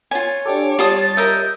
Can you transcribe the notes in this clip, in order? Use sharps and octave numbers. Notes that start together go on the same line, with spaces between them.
F4 C#5 G#5
D4 G4 A4 D6
G3 F4 A5 D#6 A6
A#4 D#5 E5 G6